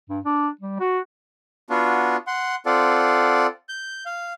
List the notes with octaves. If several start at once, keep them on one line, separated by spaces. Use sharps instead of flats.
G2
D4
G3
F#4
B3 D4 F4 F#4
F#5 C6
C4 F4 A4 D5 F#5
G6
F5